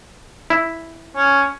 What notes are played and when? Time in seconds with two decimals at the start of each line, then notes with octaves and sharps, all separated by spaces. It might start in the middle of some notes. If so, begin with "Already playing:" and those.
0.50 E4
1.16 C#4